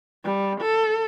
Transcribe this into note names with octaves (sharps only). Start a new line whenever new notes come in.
G3
A4